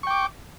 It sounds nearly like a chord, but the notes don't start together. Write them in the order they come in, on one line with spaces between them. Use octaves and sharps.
C#6 G5 D6